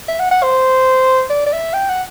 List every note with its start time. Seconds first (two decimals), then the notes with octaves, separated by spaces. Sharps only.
0.08 E5
0.20 F#5
0.31 F#5
0.43 C5
1.30 D5
1.46 D5
1.53 E5
1.74 G5
1.90 F#5